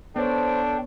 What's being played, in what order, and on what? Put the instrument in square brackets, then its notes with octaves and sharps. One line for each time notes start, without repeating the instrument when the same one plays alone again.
[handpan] B3 C#5 [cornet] D4 [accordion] A4 G5 [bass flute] C5